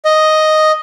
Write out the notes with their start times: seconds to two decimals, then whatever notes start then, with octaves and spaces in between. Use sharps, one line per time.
0.05 D#5